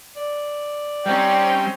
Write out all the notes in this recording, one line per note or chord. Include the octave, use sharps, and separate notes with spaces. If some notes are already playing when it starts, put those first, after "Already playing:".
D5
G3 C4 C#4 D#4 G5